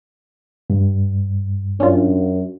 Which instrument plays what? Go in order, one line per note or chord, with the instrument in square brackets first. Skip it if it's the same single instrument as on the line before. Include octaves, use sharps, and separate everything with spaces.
[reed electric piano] G2
[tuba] F#2 [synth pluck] C#4 D4 F4